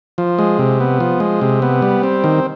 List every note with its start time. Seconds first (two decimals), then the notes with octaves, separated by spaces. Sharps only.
0.18 F3
0.39 G#3
0.59 C3
0.80 B3
1.00 F3
1.20 G#3
1.41 C3
1.62 B3
1.82 G3
2.03 C4
2.24 D#3